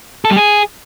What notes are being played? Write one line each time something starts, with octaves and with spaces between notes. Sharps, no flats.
A4
G3
G#4